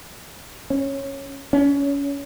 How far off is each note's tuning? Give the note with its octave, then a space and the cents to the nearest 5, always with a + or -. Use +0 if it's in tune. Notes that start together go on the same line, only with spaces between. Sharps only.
C#4 -10
C#4 +25